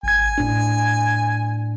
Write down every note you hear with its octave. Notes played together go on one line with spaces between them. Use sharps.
G#1 G#5 G#6
A2 D4